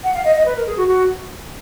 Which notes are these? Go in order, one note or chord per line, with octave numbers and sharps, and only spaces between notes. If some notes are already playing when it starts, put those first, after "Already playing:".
F#5
F5
D#5
D#5
B4
A#4
G#4
F#4
F#4